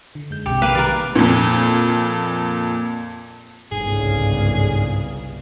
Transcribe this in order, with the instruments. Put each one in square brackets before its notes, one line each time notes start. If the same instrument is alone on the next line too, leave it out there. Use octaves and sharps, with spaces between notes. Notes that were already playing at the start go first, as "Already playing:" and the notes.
[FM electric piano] D3
F#2 G#3 G6
[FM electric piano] B1 C3 [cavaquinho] G4
[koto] A#3 B4 F5
[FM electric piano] D#3 G3 [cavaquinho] A#4 D5
[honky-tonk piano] F2 A#2
[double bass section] G1 C2 C#3 [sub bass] G#2 [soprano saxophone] G#4